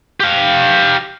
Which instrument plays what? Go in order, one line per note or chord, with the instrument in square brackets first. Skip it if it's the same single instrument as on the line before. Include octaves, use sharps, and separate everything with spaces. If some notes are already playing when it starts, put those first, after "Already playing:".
[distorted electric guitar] G4 F5